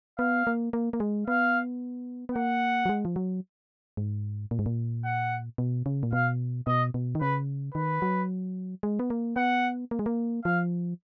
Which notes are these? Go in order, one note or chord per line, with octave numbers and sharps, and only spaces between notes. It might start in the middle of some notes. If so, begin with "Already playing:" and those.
B3 F5
A#3
A#3
A#3
G#3
B3 F5
B3
A#3 F#5
F#3
G#3
F3
F#3
G#2
A#2
G#2
A#2
F#5
B2
C#3
A#2
B2 F5
B2 D#5
B2
D#3
C#3 B4
D#3 B4
F#3
G#3
B3
A#3
B3 F#5
A#3
G#3
A#3
F3 F5